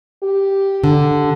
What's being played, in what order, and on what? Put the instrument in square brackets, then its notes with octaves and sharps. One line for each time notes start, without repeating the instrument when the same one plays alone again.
[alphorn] G4
[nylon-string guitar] D3